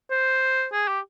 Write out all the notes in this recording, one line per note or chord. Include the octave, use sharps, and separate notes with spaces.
C5
G#4
G4